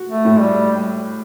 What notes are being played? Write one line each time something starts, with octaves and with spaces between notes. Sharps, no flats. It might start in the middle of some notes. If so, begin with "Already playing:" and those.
Already playing: F#4
A3
A2
G3